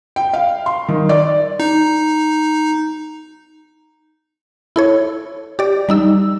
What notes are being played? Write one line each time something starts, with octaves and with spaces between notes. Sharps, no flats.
G5
F5
C6
D#3
D5
D#4
E4 A4 C#5
G4 D5
G3 D#4 E6